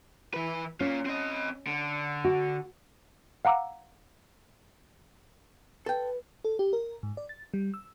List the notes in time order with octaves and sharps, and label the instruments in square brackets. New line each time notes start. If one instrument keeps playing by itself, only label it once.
[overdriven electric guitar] E3 B4
[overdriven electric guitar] A#3 F4 [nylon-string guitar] C#4
[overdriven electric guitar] C4 D#5
D3
[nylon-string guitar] F#4
[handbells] F5 F#5 A#5 D6 E6
[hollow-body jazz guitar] A4 G5 [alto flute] B4
[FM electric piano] A4
G4
A#4
G#2
D5
A6
G3
E6